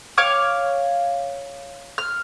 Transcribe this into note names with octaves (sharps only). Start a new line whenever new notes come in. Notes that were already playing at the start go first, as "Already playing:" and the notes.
C#5 F5 D6
F6